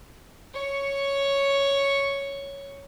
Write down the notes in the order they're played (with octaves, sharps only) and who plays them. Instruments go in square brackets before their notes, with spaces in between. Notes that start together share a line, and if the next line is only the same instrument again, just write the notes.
[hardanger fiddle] C#5 C#6